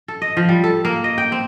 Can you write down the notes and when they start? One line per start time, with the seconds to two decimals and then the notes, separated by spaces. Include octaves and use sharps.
0.08 A4
0.22 D#5
0.37 F3
0.49 G3
0.64 A4
0.85 A#3
1.04 D#5
1.18 G5
1.32 C4